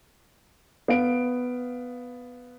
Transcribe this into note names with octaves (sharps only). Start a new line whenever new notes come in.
B3 F5 D7